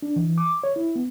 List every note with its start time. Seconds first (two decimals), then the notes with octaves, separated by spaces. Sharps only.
0.02 D4
0.16 E3
0.38 D6
0.64 C#5
0.76 E4
0.96 B3